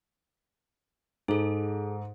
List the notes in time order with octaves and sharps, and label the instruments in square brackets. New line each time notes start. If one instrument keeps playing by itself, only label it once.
[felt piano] G#2 [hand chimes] G#4 A4